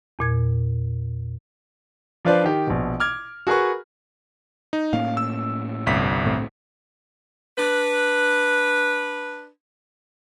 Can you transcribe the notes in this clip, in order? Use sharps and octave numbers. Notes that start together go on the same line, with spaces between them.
E2 A#2 G#6
F3 D4 F4 B4 C5 D5
D#3 G4
A#1 B2
D6 F6 G#6
F#4 G#4 A#4 B4 C#6
D#4
A2 A#3 C#4 F5
E6
G1 C2 B6
A2 A3 C4
D4 B4